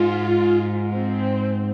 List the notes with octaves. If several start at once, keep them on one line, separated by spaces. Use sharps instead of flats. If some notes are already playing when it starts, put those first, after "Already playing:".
Already playing: G#2 F4
C4